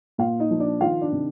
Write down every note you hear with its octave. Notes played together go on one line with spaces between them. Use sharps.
A#2 F4 F5
D#4 D#5
F3
D4 D5
D#3 F4 F5
D4 D5
C3